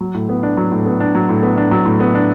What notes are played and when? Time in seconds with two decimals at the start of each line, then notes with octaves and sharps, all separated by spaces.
0.01 F#3
0.14 A2
0.29 B3
0.43 D4
0.57 F#3
0.72 A2
0.86 B3
1.00 D4
1.15 F#3
1.29 A2
1.43 B3
1.57 D4
1.71 F#3
1.86 A2
2.00 B3
2.15 D4